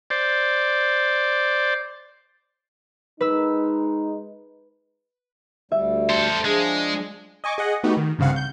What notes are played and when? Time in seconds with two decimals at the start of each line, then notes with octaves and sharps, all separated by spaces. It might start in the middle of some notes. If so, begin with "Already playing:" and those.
0.10 C5 D5
3.21 G#3 D#4 B4 E6
5.72 D2 G3 E5
6.10 A4 C5
6.45 F3 G#3 D4 G#4
7.44 D#5 G#5 C#6 D6
7.58 G#4 D#5 F#5
7.83 A3 B3 D#4 F#4 G4
7.97 D#3
8.18 C2 G2 C#3 C4 F5 F#5
8.36 G6